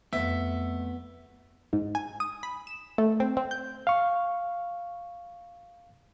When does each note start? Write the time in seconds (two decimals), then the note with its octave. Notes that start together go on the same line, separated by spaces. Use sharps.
0.13 F2 A3 B3 E5
1.73 G#2
1.95 G#5
2.20 D#6
2.43 B5
2.67 E7
2.98 A3
3.20 C4
3.37 C4
3.51 G6
3.87 F5 C#6